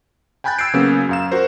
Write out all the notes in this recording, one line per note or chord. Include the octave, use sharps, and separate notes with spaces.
G5 G#5 B5 F#6 G6 A6
E6 G#6 A6 C7 D7
C#3 F#3 A#3 B3 C#4
F#2 F5 E7
F#4 A#4 C5